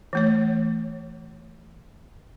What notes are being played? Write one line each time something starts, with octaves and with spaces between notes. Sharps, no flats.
E3 A3 C#5